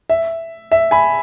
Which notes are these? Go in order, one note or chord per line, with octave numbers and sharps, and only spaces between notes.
E5
E5
G#5 B5